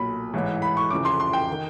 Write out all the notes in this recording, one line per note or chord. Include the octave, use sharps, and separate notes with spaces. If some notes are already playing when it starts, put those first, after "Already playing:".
Already playing: B1 A#2 B5
A1 G#2 E3
B5
C#6
F1 F2 C#3 E3 D6
C6
C6
G5
D#3